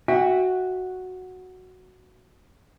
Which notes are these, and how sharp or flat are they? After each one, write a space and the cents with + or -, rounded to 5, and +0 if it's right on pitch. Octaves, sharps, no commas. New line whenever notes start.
F#4 +0 E5 +0 G5 +35